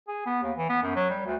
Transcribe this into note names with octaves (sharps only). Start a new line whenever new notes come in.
G#4
B3
D#2
E3
B3
F#2
F#3
G3
D2